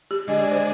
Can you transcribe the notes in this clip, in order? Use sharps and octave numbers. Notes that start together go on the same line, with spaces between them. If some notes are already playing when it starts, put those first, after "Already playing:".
G4
D3 G#3 D4 G#4 D#5
D5
C5